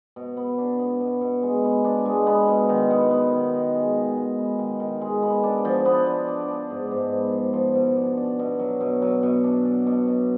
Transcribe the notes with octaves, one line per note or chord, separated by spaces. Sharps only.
B2
B3
D4
B3
B2
B2
G#3
B3
D4
G#3
B3
B2
D#3
B3
B3
D#3
D#3
G#3
D#3
G#3
B3
D#3
D#3
G#3
B3
D4
F3
B3
D4
D4
D4
G#2
G#2
B3
F3
F3
B2
D4
D4
B2
F#3
B2
F#3
B2
D4
D4
B2
B2